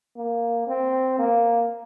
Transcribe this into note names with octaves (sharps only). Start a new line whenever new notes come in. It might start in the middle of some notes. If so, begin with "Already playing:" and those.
A#3
C4
A#3